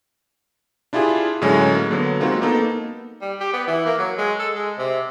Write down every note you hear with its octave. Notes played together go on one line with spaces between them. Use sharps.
D4 E4 F4 G4 G#4
A2 D3 F#3 G#3 C#4
A#3
D3 F#3 B3
G#3 A#3 C4 D#4 F4 F#4
A#3 B3 D#4 A4
G3
G4
B3
E3
A#3
F#3
G#3
A4
G#3
C3